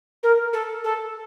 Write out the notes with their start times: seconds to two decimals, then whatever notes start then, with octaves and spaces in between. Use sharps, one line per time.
0.23 A#4
0.53 A4
0.83 A4